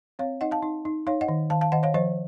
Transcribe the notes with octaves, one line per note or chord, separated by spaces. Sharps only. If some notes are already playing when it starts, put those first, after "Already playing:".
C4 C#5 F5
D#4 D#5 F#5
F5 A5
D#4
D#4
D#4 C#5 F5
D#5 F#5
D#3
D#3 F5 A5
F5 A5
D#3 D#5 F#5
C#5 F5
F3 C5 D#5